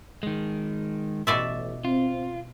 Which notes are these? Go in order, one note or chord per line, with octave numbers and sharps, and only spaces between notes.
D#3 G#3
A1 B2 D5 E5
C4 F4